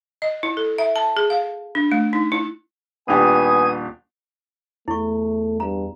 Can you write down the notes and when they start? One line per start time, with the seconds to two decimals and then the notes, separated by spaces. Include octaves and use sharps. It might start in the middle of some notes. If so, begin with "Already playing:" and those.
0.22 D#5
0.43 E4
0.57 A4
0.78 E5
0.96 A5
1.17 G#4
1.30 F5
1.75 D4
1.92 A3
2.13 D#4
2.32 E4
3.08 D#1 B3 D4 G4 G#5 D#6
4.88 E2 A3 E4 C#6
5.60 G2 A#5